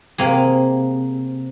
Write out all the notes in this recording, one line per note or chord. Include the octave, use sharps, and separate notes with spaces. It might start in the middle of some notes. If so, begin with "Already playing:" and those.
C3 A#3 G#4